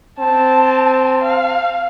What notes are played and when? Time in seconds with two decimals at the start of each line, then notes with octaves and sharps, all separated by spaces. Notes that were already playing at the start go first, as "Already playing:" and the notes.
0.19 C4 A5
1.21 F5